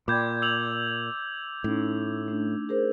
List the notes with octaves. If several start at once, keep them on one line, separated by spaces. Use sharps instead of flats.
A#2 D5 G5 B5 D6 G6 G#6
E6 F7 F#7
A2 C#4 D#4
A3 D4
G#4 A#4 C5